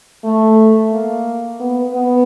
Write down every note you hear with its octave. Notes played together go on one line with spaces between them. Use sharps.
A3
A#3
B3
B3